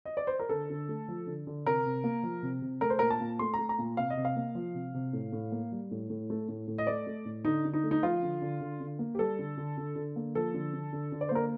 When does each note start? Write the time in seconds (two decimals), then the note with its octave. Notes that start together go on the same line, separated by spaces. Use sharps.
0.05 D#5
0.17 D5
0.27 C5
0.39 A#4
0.49 D3 A4
0.70 D3
0.89 A3
1.08 F3
1.27 D3
1.47 D3
1.66 C3 A#4
1.85 C3
2.04 A#3
2.23 F3
2.43 C3
2.62 C3
2.81 A3 A#4
2.90 C5
2.99 A#2 A#4
3.10 A5
3.20 A#2
3.39 A3 C6
3.54 A3 A#5
3.69 A#5
3.78 A#2
3.97 C3 F5
4.10 D#5
4.17 C3
4.25 F5
4.36 A#3
4.55 F3
4.74 C3
4.94 C3
5.13 A2
5.32 A2
5.52 A#3
5.72 G3
5.91 A2
6.10 A2
6.30 A3
6.48 A2
6.67 A2
6.78 D#5
6.87 A3 D5
7.07 A3
7.25 A2
7.45 D3 D#4
7.65 D3
7.74 D#4
7.83 A3
7.91 D#4
8.03 F3 F4
8.22 D3
8.42 D3
8.60 D3
8.80 D3
8.99 A#3
9.15 G4
9.19 G3 A4
9.39 D3
9.57 D3
9.77 D3
9.96 D3
10.16 A#3
10.35 F3 A4
10.54 D3
10.73 D3
10.93 D3
11.12 D3
11.21 D5
11.29 C5
11.31 A#3 A#4